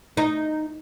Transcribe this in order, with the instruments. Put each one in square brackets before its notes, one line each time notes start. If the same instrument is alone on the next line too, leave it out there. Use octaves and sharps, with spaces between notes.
[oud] D#4